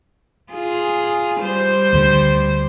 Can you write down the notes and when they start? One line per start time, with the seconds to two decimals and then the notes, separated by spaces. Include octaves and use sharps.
0.51 F4 G#4
1.41 G3 C5
1.93 D2 D3